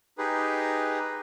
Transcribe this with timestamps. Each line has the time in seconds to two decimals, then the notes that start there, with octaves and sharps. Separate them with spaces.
0.18 D#4 G4 G#4 B4